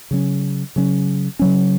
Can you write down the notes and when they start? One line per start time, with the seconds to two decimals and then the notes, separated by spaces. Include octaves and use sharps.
0.11 C#3 F#3 C#4
0.76 C#3 F#3 C#4
1.39 C#3 F#3 C#4